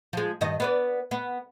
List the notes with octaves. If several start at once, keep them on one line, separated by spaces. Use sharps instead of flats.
F3 G#3
G2 D#3 D#5
B3 B4 D5
B3